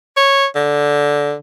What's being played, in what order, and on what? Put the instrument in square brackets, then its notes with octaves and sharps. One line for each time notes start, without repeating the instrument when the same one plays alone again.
[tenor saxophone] C#5
D3